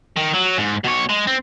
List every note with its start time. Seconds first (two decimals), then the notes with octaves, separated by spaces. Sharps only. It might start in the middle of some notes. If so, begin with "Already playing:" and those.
0.17 D#3
0.34 F#3
0.58 G#2
0.84 B2 C#5
1.09 G#3
1.27 C4